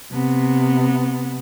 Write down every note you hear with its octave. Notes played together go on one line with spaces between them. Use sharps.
C3 B3